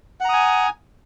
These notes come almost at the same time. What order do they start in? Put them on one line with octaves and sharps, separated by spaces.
F#5 A#5 D#6 G#5